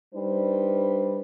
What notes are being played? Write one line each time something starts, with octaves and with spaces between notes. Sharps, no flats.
G3 D4 D#4 B4 C5